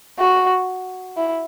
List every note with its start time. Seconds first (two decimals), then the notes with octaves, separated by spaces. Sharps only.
0.19 F#4
1.17 E4